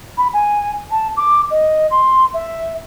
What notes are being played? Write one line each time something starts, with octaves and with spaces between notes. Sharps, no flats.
B5
G#5
A5
D6
D#5
C6
E5